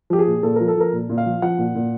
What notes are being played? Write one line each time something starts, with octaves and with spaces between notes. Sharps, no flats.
F3 G4
G#4
A#2
A#2 A4
F3 A#4
A4
F3 A#4
A#2
A#2
F5
F3
F3 F#5
A#2
A#2